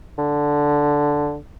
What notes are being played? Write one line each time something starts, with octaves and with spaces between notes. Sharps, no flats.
D3